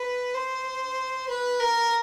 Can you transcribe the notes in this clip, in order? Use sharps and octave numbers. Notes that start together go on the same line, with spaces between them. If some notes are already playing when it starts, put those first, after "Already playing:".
Already playing: B4
C5
B4
A#4